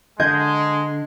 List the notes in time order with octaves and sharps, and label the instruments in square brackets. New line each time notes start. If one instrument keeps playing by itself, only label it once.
[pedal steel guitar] D3 [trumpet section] G#3 [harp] D#5 G6 G#6